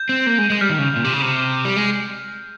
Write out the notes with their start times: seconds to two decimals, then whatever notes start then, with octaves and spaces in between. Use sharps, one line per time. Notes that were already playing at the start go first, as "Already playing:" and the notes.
Already playing: G6
0.09 C4
0.27 A#3
0.38 G#3
0.50 G#3 G6
0.61 G3 F6
0.70 D#3
0.79 C#3
0.96 A#2
1.04 C3
1.13 C#3
1.22 C3
1.65 G3
1.77 G#3